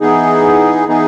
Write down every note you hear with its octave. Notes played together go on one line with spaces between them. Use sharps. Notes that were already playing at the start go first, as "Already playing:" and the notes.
E3 B3 D#4 G#4
E3 B3 D#4 G#4